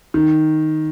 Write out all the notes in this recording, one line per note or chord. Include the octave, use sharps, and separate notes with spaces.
D#3